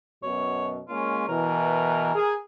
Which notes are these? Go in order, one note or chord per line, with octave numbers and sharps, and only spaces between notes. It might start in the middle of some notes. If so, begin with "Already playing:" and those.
F#2 B2 C#5
G#3 A#3 C#4 F4
B2 E3 A#4
G#4